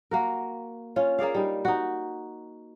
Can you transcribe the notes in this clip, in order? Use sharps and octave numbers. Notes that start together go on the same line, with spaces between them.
A#3 F#4 A#4
C#4 F4
A#3 G#4 D5 F5
G3 D#4
D#4 F#4